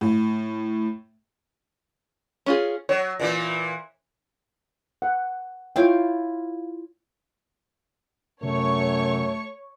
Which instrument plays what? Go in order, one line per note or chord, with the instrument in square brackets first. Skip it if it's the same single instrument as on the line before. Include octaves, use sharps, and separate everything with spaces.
[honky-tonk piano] A2
[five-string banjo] C#4 F4 G#4
[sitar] F#3 [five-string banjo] C#5
[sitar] A#2 E3 A#3
[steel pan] F#5
[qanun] E4 F4 F5 [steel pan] C#5 G5
[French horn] F#2 [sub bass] C3 [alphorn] A3 [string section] C#5 C#6